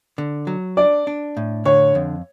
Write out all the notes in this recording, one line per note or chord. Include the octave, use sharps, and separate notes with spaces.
D3
F#3
D4 D5
D4
A2
D3 C#5
F2